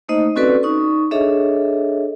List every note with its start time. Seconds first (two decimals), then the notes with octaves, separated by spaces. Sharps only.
0.09 A3 A#3 D#4 C5 D#5
0.36 C4 C#4 F#4 A4 B4 D5
0.63 D#4 C#6
1.11 D4 G#4 A4 C#5 D#5 E5